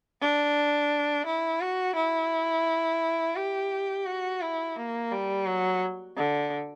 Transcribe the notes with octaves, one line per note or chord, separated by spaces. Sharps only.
D4
E4
F#4
E4
G4
F#4
E4
A#3
G3
F#3
D3